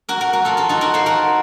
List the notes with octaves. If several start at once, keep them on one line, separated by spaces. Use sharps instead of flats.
F#4 A#4
F#4 A#4
F#4 A#4
F4 A4
F4 A4
D#4 F#4
F#4 A#4
A4 C5
F#4 A#4